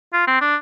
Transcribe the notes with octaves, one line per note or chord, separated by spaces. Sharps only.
F4
C4
D4